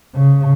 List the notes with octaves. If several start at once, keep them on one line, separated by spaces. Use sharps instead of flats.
C#3